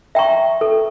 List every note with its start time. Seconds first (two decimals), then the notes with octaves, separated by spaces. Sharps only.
0.15 E5 G5 A#5 C#6
0.61 A4